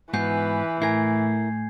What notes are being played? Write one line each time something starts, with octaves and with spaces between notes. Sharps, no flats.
G#2 E3 B3 F#4 B4 G#5 G6 C7
A2 E4 A#4 G#5 G#6 C7